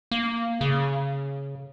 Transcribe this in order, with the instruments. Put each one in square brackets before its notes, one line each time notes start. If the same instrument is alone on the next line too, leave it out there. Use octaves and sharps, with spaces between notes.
[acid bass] A#3
C#3